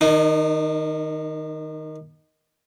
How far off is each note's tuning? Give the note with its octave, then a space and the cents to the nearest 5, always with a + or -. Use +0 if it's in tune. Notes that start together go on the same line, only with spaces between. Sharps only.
D#3 +0 D#4 -45